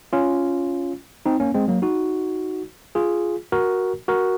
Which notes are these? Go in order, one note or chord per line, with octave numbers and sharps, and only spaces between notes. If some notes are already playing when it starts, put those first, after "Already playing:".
C#4 F4
C4 D#4
A#3 C#4
G#3 C4
F#3 A#3
D#4 F#4
F4 G#4
F#4 A#4
F#4 A#4